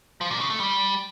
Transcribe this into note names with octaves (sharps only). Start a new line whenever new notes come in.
F3
A#2
C#3
A3
G3